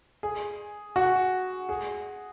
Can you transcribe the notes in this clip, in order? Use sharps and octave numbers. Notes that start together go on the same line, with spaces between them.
G#4
F#4
G#4